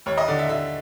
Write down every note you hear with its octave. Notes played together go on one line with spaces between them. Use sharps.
D#2 C#5
D#5
D3 D5
E5
D3 E5